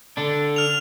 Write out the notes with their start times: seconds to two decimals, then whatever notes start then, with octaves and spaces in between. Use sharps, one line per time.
0.17 D3 D4
0.56 F6 F7